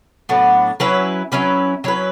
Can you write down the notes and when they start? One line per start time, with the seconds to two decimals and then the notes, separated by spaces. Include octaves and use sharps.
0.29 A2 F#3 B3 D4
0.80 F#3 C#4 E4 B4
1.32 F#3 C#4 E4 B4
1.84 F#3 C#4 E4 B4